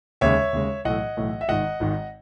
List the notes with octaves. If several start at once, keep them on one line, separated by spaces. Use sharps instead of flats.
D#2 C#3 G#3 C#5 E5
D#2 C#3 G#3
B1 A2 E3 A3 D#5 F#5
B1 A2 E3 A3
E5
G#1 G#2 D#3 D#5 F#5
G#1 G#2 D#3